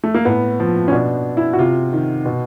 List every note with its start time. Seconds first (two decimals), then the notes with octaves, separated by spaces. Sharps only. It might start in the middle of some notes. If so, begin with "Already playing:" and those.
0.04 A3
0.14 A#3
0.25 A2 B3
0.60 F3
0.88 C#4
0.92 B2 D4
1.37 E4
1.53 F#4
1.58 C3 F4
1.93 D#3
2.26 B2